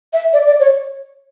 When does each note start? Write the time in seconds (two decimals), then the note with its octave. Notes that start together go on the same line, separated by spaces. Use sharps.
0.13 E5
0.33 D5
0.47 D5
0.60 C#5